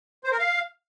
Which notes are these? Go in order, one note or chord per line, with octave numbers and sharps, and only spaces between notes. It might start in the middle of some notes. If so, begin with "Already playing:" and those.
C5
A#4
F5